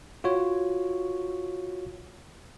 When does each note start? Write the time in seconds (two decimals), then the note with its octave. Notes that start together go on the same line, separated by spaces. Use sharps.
0.24 F4 F#4 C#5